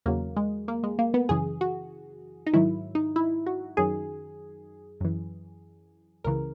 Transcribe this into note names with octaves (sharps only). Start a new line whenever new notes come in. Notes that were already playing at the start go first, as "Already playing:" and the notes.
E2 C#3 F#3 A#3
G#3
A#3
G#3
A#3
B3
F#2 C#3 E3 G#4
F#4
D#4
G#2 D#3 F#3 E4
D#4
E4
F#4
F#2 D#3 F#3 G#4
F#2 E3
C#2 C#3 E3 A#4